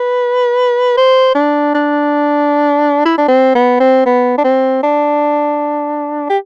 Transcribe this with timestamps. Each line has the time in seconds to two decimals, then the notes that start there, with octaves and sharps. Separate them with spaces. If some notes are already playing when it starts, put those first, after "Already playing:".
Already playing: B4
0.97 C5
1.35 D4
1.75 D4
3.05 E4
3.18 D4
3.28 C4
3.55 B3
3.80 C4
4.06 B3
4.38 D4
4.45 C4
4.83 D4
6.30 G4